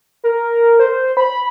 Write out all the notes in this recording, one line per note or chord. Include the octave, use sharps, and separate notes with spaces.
A#4
C5
B5